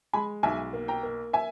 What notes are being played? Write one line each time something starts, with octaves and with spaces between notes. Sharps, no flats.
G#3 G#5 B5
B1 E5 G#5
A#3
G5 A#5
A#3
E5 G#5